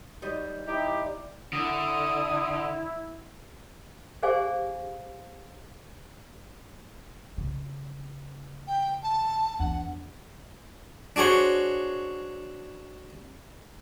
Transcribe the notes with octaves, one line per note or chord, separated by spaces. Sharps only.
D#2 G3 D#5
D#4 E4 G4
D3 E4 D#6
G4 G#4 C5 D5 F5 G#5
C#3
G5
A5
E2 D4 F#5
D4 F#4 G#4 C5 C#5